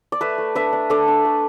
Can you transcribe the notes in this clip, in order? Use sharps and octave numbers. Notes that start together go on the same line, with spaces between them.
D5
A3 B4 E5
A3
D4 B4 E5
D4
D4 A4 D5
D4
A3